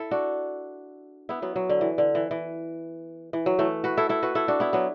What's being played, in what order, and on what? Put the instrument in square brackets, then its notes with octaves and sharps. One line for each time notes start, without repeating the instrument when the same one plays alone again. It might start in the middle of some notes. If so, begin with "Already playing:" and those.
Already playing: [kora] E4 A4
D4 F#4
B3 E4
F#3 B3
F#3
D3
E3
D3
E3
E3
E3
F#3
E3 A3
F#4 B4
E4 A4
E4 A4
F#4 B4
E4 A4
D4 F#4
B3 E4
F#3 B3